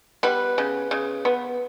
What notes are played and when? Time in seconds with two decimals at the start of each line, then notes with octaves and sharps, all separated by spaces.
0.23 G3 B3 B4
0.58 C#3
0.91 C#3
1.25 B3